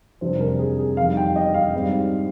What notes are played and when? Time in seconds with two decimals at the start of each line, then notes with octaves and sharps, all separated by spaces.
0.21 F2 C3 G3 D4 C5
0.40 A#4
0.59 G#4
0.79 G#4
0.97 F2 D#3 G3 F5
1.17 G5
1.36 D#5
1.54 F5
1.73 G#2 G3 C4